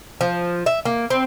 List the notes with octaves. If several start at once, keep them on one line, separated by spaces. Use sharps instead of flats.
F3
E5
A#3
C4